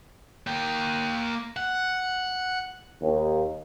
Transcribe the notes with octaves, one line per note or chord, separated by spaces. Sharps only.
A#3 G5
F#5
D#2